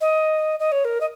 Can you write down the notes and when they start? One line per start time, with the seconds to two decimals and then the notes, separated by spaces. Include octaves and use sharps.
0.01 D#5
0.59 D#5
0.72 C#5
0.85 A#4
1.00 D#5